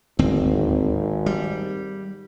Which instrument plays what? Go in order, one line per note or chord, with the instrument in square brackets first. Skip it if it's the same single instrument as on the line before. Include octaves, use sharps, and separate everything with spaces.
[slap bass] D1 D#2 C4 [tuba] G#1
[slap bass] G3